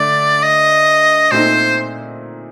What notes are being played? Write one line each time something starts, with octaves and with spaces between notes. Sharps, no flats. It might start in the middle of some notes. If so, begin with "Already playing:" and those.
Already playing: D3 A3 D4 D5
D#5
A#2 A3 C4 D#4 C5